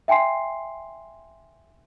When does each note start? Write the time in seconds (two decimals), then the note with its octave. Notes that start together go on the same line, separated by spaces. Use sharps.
0.08 E5 G5 G#5 C6 C7